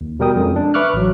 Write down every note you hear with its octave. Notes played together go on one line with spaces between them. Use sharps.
D#2
B2 G3 A#4 G5 D#6
F2 G#3 C#4
D4
B4 E5 C#6 D6 F6 F#6
A1 F#3